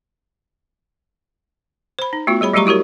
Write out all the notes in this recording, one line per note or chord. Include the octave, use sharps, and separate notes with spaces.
C5 B5
D#4
A3 B3 F4 F#4
G3 G#4 C#5 B5
F#3 G3 A3 G4 A#5 C#6
E4 F#4 G4 A#4 C#5